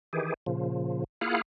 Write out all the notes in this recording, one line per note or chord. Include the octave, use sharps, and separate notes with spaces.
D#3 E3 G4 G#4
A#2 C#3 F3
A#3 E4 F4 G#4 F5 F#5